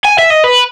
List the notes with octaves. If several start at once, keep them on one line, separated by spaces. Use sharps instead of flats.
G#5
E5
D#5
B4